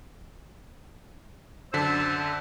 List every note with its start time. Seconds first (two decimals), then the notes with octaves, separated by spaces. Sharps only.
1.73 F#2 D3 C5 A5 E6 B6